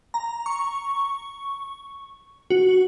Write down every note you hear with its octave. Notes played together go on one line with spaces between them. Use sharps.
A#5
C#6
F#4